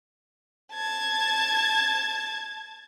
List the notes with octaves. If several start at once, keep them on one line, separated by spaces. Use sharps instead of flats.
A5 G#6